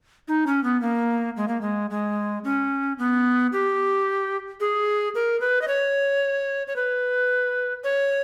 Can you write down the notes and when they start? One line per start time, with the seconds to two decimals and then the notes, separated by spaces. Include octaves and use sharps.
0.28 D#4
0.47 C#4
0.64 B3
0.81 A#3
1.37 G#3
1.48 A#3
1.61 G#3
1.90 G#3
2.44 C#4
2.99 B3
3.52 G4
4.60 G#4
5.15 A#4
5.41 B4
5.62 D#5
5.68 C#5
6.67 C#5
6.76 B4
7.84 C#5